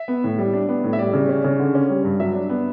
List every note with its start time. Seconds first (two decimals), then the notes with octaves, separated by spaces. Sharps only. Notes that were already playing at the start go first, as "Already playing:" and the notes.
Already playing: E5
0.08 B3
0.24 A2
0.38 G3
0.53 D4
0.69 B3
0.84 A2
0.93 E5
0.99 G3 D5
1.14 C#3
1.29 C#4
1.45 C#3
1.59 D3
1.75 C#4
1.89 G3
2.05 G2
2.20 F#3 E5
2.35 D4
2.50 B3